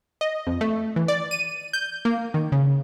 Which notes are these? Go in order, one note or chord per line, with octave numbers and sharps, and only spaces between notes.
D#5
F2
A3
E3
D5
D#7
G6
A#3
D#3
C#3